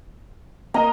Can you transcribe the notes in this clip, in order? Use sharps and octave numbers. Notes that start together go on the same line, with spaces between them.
A#3 D#5 A#5